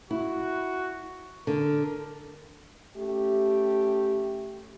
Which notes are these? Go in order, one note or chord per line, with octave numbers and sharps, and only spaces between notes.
E4 F#4
D3 A#4
A3 C#4 G4